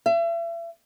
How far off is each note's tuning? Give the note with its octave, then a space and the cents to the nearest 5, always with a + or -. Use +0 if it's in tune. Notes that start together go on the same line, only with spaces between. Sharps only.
E5 +40